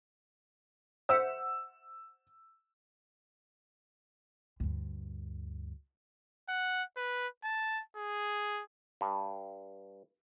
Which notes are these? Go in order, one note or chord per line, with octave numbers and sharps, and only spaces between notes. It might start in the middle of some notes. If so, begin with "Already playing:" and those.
C5 E5 F#5 E6
D2 G2
F#5
B4
A5
G#4
G2